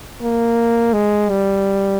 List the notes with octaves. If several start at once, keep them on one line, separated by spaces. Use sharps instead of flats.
A#3
G#3
G3